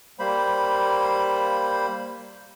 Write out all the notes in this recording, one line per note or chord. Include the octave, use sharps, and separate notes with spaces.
G3 A#3 C5 B5